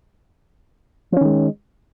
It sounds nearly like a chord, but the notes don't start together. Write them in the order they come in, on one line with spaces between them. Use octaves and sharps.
F3 C#4 D#3 G#3